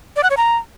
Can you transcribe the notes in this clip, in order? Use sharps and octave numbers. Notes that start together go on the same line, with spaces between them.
D5
F#5
C#5
A#5